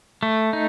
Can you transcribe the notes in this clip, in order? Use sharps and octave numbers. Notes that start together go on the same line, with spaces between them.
A3
D#4